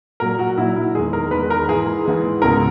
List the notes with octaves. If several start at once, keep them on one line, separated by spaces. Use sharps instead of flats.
A#2 F#3 A#4
F#4
A#2 F#3 E4
E4
E2 D#3 G#3 G#4
A#4
E2 D#3 G#3 B4
A#4
G#2 E3 G#3 G#4
G#2 E3 G#3
C#2 B2 G#3 A#4